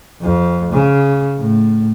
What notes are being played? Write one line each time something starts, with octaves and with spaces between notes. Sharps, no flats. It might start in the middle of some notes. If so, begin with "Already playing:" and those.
F2
C#3
A2